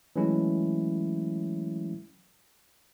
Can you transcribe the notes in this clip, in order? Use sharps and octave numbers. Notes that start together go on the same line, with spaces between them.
E3 F#3 G#3 A3 C#4 E4